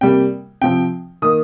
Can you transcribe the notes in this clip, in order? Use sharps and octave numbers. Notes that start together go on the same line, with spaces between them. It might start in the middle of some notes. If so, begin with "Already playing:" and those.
C3 G3 A#3 G5
C3 F3 C4 G5
D#3 A#3 D#6